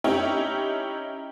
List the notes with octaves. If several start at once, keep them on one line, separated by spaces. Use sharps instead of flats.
C#4 D#4 E4 G4